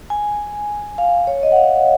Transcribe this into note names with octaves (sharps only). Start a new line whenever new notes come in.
G#5
F5
C#5
D#5
F#5
F5